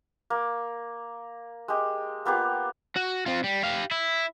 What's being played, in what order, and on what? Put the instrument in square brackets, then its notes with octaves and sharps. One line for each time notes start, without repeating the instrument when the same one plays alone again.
[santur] A#3
G#3 G4
A#3 B3 F4 G4
[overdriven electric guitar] F#4
C4 F4
G3
G4 F5
E4